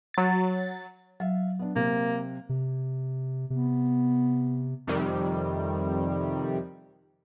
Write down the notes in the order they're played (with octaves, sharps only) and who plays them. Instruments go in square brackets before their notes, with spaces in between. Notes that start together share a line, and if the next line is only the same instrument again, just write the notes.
[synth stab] F#3 A6
[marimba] F#3 [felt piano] E5 F5
[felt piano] B3 D4
[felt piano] C3 [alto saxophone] A#3
[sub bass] C3
[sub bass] C3 [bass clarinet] B3
[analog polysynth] F2 C3 D#3 G3